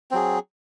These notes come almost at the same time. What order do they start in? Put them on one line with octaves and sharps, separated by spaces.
C4 F#3 G#4